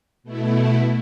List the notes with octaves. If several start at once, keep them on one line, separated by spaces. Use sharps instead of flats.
B2 A3 E4